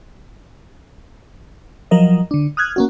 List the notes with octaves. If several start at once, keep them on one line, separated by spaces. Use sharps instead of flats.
F3 F#3 A#4 D#5
D3 D4
D#6 F6 F#6 G#6
A#3 C#4 F#4